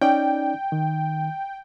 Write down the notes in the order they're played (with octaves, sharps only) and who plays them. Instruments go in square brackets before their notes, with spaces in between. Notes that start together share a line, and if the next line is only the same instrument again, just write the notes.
[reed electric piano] C#4 D#4 D5 [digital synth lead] G5
[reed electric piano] D#3